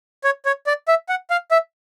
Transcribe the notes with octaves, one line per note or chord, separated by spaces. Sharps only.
C#5
C#5
D5
E5
F#5
F5
E5